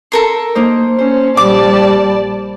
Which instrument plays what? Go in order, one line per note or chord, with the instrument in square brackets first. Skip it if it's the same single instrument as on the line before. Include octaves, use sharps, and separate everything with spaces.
[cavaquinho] A4 A#4 C6
[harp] A#3 D#4 C5
[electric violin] C#4 [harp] C5
[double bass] A#1 G3 [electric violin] D5 A5 [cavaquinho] D6